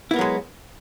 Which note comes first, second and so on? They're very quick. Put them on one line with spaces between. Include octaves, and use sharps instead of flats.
E4 B3 A#4 F#3 G#3